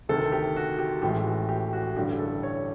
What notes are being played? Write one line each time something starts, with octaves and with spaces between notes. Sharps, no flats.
D2 C3 D#3 A4
G4
F#4
G4
A1 A2 E3 G#3 G4
F#4
G4
F#4
A1 G2 D3 G3 G4
A4
C#5